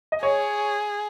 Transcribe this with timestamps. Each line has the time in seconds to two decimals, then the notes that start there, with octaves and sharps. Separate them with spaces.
0.12 D#5
0.23 G#4 C#5